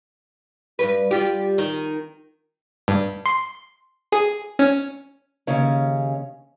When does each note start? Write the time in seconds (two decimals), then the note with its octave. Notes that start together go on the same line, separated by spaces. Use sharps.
0.79 G2 A#2 B4
1.11 G3 F4 G4
1.58 D#3
2.88 G2
3.26 C6
4.12 G#4
4.59 C#4
5.47 D#2 C#3 C#4